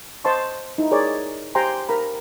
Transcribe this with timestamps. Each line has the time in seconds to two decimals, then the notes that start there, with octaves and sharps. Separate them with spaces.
0.24 C5 D#5 A5 C6 C#6
0.78 D#4 E4
0.91 G#4 A#4 C#5 D5
1.55 G4 C5 G5 G#5 A#5 C6
1.89 A#4 A#5 B5